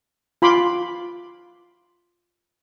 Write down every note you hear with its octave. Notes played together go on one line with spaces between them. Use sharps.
F4 B5 C6 D6